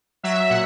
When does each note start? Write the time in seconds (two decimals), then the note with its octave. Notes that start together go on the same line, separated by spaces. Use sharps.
0.23 F#3 E5
0.50 A#2 F#5